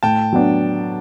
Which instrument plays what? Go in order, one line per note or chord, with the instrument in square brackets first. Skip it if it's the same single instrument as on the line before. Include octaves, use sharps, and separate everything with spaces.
[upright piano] A2 [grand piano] G5 A5
[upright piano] F#3 B3 D4